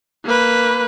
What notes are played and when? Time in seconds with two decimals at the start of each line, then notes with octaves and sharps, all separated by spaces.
0.25 A#3 B4